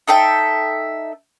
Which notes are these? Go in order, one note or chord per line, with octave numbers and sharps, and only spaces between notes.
D#4 A4 E5 G5